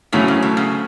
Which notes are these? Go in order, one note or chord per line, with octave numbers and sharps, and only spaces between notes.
A2 C#3 E3 F#3 A3 C#4
C#3
B2
C#3